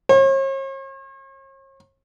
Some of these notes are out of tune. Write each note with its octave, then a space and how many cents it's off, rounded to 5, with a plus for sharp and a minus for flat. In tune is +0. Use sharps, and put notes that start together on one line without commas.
C#5 -45